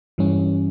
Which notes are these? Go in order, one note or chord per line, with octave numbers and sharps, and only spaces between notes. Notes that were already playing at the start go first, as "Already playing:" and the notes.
G2 E3 G3 C#4